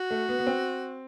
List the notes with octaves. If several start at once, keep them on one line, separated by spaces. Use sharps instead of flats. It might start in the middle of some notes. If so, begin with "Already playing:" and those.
Already playing: F#4
A3
B3
B3
C4